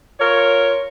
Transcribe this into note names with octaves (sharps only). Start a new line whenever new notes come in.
F4 A#4 C#5